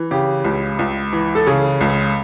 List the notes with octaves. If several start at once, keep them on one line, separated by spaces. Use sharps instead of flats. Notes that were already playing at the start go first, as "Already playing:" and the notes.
Already playing: E3
C#3 G4
C#2
C#2
E3
A4
C#3 G#4
C#2